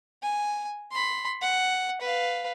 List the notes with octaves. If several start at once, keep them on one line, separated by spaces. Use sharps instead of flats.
G#5
B5 C6
F#5
B4 F5